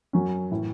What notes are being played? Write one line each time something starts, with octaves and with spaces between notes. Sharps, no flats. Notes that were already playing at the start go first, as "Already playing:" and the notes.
F#2 F#3 C#4
A2 E3